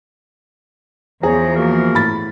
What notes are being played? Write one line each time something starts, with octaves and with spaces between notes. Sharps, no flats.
E2 F3 G#4 C5 C#5 A#5
A#3 F#4 A#4
A2 B5 A6